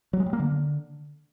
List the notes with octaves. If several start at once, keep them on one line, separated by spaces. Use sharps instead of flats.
F#3
G#3
G3
A#3
D3